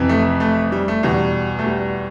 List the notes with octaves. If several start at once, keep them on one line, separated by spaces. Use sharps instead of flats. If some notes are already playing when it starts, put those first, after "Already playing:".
Already playing: F2 C3 E3
A3
A3
G3
A3
E2 B2 G3
A3
G3